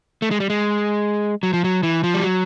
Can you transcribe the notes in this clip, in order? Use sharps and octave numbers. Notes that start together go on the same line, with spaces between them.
A3
G#3
G3
G#3
F#3
F3
F#3
E3
F3
G3
F#3